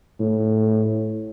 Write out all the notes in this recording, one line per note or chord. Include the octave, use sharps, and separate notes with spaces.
A2